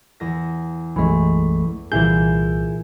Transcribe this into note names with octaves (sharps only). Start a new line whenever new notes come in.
E2 A#6
B1 F#2 E3 G#3 A3
C2 A#2 E3 E4 G#4 G6